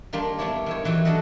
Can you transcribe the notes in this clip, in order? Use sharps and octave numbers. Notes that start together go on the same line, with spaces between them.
D#3 G3 A#3 D4 F4
G3 B3 D4 E4 C#5 D5
D#3 E4 C#5
D#3 E3 F#3 G3
D4 F#4 A4 D#5 E5 F#5